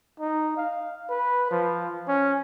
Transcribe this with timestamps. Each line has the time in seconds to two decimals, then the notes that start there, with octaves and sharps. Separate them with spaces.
0.20 D#4
0.57 F5
1.10 B4
1.51 F3
2.08 C#4